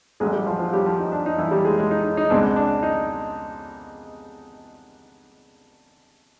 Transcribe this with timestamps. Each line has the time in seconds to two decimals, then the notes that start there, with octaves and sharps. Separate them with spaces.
0.20 A1 A2 F#3 G#3 G#4
0.33 G3 G4
0.46 F3 F4
0.59 F3 F4
0.73 G3 G4
0.86 F3 F4
0.99 D#4
1.12 D4
1.26 D#4
1.38 E3 E4
1.51 G3 G4
1.65 G#3 G#4
1.77 G#3 G#4
1.91 D#4
2.04 D#4
2.17 D#4
2.30 C#2 B2 G#3 C4 D4
2.56 D4
2.83 D#4